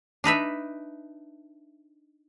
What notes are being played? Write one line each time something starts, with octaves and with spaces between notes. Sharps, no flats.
D4 D#4 B4 E5